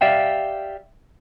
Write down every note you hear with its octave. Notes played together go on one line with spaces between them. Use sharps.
G4 D5 E5 F5 G5